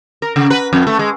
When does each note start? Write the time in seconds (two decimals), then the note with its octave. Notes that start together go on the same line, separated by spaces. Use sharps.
0.22 A#4
0.36 C#3
0.50 B4
0.73 F2
0.87 A3
0.99 G#3